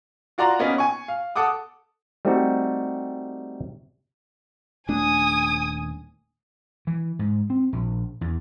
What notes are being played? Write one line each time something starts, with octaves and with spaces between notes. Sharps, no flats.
F4 F#4 D5 A#5 C6
A#3 B3 C#4 D#4
G#5 C#6
F5
A4 F#5 D6 D#6
G3 A3 C4 D#4 F#4 G4
D#1 A3 D4 G#5 D#6
E3
G#2
C4
A#1
E2